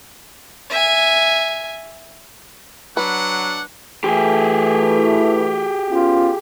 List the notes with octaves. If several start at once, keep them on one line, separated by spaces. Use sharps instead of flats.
E5 G#5
F#3 D4 B4 F#5
E3 A3 G4 G#4
B3 C#4 F4